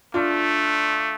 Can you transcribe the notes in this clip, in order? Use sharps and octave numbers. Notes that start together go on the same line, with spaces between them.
A3 D4 F4